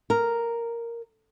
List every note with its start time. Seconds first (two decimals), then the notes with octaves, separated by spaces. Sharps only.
0.10 A#4